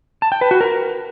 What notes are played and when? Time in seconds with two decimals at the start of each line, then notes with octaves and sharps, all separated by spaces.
0.22 A5
0.32 G5
0.41 B4
0.51 F#4
0.61 A#4